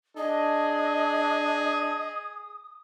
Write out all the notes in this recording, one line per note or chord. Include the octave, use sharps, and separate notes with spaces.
D4 G#4 D#5 D#6